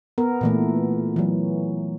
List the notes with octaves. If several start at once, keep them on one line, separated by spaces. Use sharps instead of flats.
B3 A#4
A#2 E3 A3
E3 F#3